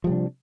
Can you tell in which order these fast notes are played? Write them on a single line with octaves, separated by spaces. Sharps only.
F3 G3 C3 D4